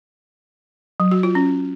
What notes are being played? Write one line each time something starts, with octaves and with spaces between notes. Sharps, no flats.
F#3
F#4
F4
C#4